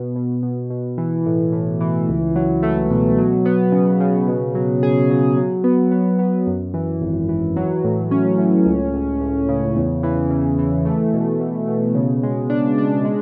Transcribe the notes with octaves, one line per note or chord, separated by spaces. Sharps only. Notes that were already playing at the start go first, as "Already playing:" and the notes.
Already playing: B2
B2
B2
B2
E3
A2
A2
E3
C#2
F#3
A3
B2
F#3
B3
C#3
C#3
B2
F#3
G#4
F#3
F#3
B3
B3
B3
F#2
E3
G#1
E3
F#3
A2
C#4
A2
C#2
C#2
C#2
C#3
E2
E3
C#3
E3
A3
B2
B2
B2
C#3
G#3
D4
D4
G#3